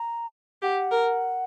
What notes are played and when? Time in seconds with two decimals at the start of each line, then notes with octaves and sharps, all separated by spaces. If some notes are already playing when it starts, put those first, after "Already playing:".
Already playing: A#5
0.62 G4 F#5
0.91 A#4